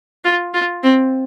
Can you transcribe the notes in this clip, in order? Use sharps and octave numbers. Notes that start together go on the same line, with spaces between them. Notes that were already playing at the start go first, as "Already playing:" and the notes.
F4
F4
C4